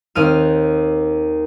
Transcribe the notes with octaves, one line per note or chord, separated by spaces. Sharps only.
D#2 C4 F6 D#7